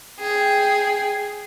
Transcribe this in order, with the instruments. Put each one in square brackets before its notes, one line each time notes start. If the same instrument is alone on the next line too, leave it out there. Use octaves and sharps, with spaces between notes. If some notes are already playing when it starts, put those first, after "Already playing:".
[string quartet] G#4 G5